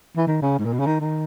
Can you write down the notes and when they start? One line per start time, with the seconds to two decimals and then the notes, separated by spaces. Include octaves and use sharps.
0.17 E3
0.27 D#3
0.42 C#3
0.59 G#2
0.65 A#2
0.73 B2
0.79 C#3
0.86 D#3
1.00 D#3